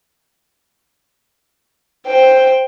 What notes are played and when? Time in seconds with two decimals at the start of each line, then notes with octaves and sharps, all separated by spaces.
2.07 C5 G5